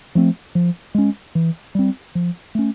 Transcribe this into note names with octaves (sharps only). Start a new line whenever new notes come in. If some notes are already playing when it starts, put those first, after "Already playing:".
F3 A3 C4
F3
G#3 C#4
E3
G3 C4
F3
A3 C#4